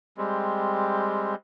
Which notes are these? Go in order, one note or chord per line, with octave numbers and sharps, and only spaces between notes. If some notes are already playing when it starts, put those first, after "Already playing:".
G3 G#3 C4